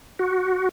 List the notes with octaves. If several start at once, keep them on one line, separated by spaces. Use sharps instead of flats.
F#4